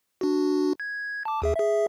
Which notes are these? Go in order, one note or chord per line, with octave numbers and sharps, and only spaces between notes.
D4 F#4
G#6
A5 D6
D#2 G#4 E5
G#4 E5